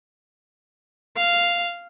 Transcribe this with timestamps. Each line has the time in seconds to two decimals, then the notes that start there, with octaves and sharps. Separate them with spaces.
1.17 F5